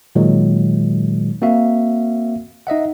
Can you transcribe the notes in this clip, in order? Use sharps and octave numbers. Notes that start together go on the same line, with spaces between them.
A#2 D#3 F#3 G#3
A#3 C4 F#4 E5 F5
D#4 D#5 E5 F#5